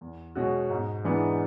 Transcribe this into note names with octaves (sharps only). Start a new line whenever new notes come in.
E2
B2 G#3 C#4 F#4
G#2
E3 G#3 B3 D4